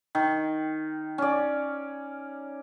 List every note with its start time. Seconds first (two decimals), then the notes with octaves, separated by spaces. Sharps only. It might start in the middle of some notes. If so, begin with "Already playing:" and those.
0.15 D#3
1.18 C#4 D5